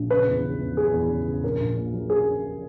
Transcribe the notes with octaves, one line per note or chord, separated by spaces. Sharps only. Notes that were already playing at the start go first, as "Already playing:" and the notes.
Already playing: A#1
C#3 B4
E2
C#3
E2
F#3 G#4
E2
C#3
C#3
A#1 A#4
A#1
A#2
F#3
G#4